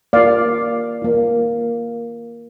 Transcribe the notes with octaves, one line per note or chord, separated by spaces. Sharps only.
A#3 F4 D5 F5
A#3 F4